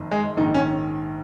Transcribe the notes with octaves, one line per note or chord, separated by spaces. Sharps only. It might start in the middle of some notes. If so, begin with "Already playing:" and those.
Already playing: F#1 F2 D#3
G#3
A#1 G#2 D#3 D#4
C#4